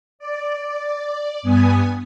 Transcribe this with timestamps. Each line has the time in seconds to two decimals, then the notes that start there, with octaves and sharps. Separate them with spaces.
0.19 D5
1.43 G2 B3 G#5 D#6